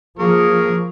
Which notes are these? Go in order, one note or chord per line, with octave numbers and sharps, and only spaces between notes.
F3 A#3 G#4 A#4 C#6